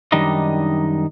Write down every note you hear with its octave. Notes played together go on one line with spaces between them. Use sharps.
F#2 D#3 G3 D4 D#4 D#5